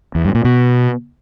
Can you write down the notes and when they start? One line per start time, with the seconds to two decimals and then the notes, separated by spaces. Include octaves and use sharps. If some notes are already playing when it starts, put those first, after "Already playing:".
0.15 E2
0.25 G2
0.35 A#2
0.45 B2